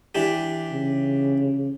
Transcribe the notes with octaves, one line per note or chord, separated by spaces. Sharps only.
E3 D4 G4
C#3